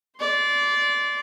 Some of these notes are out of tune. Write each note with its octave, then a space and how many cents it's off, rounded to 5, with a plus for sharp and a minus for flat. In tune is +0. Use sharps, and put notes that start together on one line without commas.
D5 -20 C6 +0